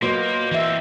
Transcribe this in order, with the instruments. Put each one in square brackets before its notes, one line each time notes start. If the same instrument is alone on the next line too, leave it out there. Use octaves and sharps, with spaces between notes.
[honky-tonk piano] A#2 F#3 B3 [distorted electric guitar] A#3 [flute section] D#5 C6 G6
[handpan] E3 E5 [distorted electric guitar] A#3 C4